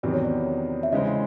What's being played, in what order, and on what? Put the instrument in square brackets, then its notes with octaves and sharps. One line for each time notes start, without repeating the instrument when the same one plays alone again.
[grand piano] E2 C3 D#3 F#3 B3 [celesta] D5
[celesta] C#5
D5
E5
[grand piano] C#3 E3 G#3 C4 [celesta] D#5